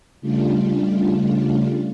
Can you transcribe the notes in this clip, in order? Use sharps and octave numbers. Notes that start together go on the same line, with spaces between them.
C#3 G3 A3 D4 F4